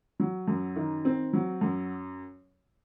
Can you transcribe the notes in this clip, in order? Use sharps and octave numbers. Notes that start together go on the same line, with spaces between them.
F#3
F#2
D#3
C4
F#3
F#2